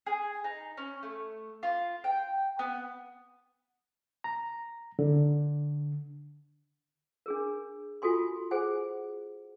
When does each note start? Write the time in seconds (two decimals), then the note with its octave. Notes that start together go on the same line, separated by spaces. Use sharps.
0.06 G#4
0.44 D#4
0.77 C#4
1.03 A3
1.63 F4
2.04 G5
2.59 B3
4.24 A#5
4.99 D3
7.26 D4 G#4 A#4
8.02 F4 F#4 A4 G#5 C6
8.51 G#4 C5 F#5 G#5